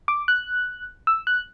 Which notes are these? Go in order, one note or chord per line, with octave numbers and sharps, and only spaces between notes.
D6
F#6
E6
F#6